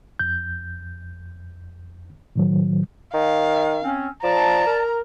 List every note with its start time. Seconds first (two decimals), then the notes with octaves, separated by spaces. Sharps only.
0.19 F2 G6
2.36 A2 D#3 F#3
3.14 D#3 F5
3.82 C4 C#4
4.23 F3 D5 A5 A#5
4.66 A#4